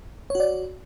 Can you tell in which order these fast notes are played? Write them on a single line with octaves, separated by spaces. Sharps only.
C#5 F#4 D5